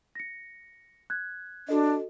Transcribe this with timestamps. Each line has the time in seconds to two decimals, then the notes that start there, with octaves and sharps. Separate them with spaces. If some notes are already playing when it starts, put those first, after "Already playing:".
0.15 A#6 C#7
1.10 F#6 G#6
1.69 D4 F#4 A4 D#5